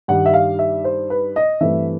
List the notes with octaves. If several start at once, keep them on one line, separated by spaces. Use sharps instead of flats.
G2 D#3 G3 F#5
E5
F5
E5
C5
B4
D#5
G2 E3 A3 C4 E5